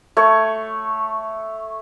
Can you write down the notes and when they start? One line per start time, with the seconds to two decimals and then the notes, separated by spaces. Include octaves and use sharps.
0.17 A3 C#5